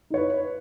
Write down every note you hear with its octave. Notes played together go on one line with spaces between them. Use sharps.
D#4 B4 C#5